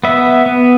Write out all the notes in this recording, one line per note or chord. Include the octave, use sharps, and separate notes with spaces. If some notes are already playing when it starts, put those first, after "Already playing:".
B3 E5
B3